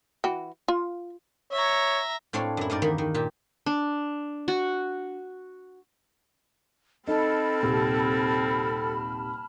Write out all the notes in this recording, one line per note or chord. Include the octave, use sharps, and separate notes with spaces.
E3 F#4 G5
F4
C#5 E5 A#5
A2 C4 D4 C#5 F5 C6
F#2 E4
G2 D#4 A#4 D5
E2 D#3 A#3 A#4 B5
D#3
A#2 G4
D4
F#4
C4 D#4 A4 A5 B5 F6
D#1 C3